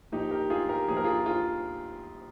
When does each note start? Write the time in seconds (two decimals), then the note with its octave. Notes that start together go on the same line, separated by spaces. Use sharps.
0.12 A#1 A#2 F3 D#4 G4
0.31 G4 A#4
0.50 F4 G#4
0.69 G4 A#4
0.88 A#1 A#2 F3 G#4
0.97 A#4
1.04 F4 G#4
1.26 F4 G#4